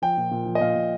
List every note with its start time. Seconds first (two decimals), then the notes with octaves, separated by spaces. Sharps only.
0.02 F3 G5
0.17 A#2
0.31 A#2
0.46 F3
0.55 D#5
0.61 A#2 F5
0.76 A#2